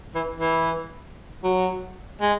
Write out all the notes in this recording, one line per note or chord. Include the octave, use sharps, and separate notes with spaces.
E3
E3
F#3
G#3